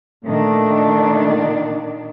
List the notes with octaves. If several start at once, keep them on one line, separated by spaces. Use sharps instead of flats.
A#2 D#3 A3 D4